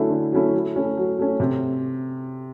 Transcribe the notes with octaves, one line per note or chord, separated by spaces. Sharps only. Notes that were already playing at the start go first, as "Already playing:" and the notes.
Already playing: D3 F#3 A3 C#4 E4
D3
F#3 A3 C#4 E4
F#3
A3 C#4
F#3
A3 C#4
C3